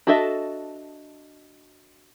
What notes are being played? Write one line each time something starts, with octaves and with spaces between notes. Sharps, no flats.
D4 F#4 A4 D#5 E5